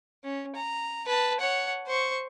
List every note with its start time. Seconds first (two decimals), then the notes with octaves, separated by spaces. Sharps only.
0.24 C#4
0.56 A#5
1.06 B4 A5
1.40 C#5 F#5
1.87 C5 C#6